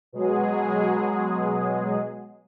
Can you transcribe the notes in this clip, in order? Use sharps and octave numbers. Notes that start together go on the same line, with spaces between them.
B2 F#3 G#3 G#4